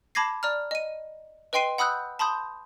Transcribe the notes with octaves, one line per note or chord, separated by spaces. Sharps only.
A5 B5 D6 G#6 A#6 C7
D5 A#5 F6
D#5 D#7
B4 D#5 G5 C6 C7 D#7
F#5 B5 D#6 E6 F#6 G6
A5 B5 C6 D#6 G6